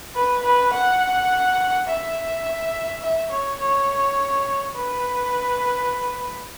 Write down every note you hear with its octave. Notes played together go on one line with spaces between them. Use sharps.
B4
B4
F#5
E5
E5
C#5
C#5
B4